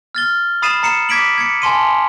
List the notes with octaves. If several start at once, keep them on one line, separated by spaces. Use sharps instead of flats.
F6 A6 G7
B5 D#6 A6 C7 D#7 E7
A#5 C7 C#7 E7
D6 G#6 B6 D7 F#7
G#6 C#7
G#5 A5 C6 D#7